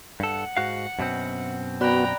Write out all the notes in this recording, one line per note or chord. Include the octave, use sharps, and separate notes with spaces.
G2 A4 F#5
G#2 F#4 F5
F#2 B2 C4
B3 F#4 D5 G5 A#5 B5 F#6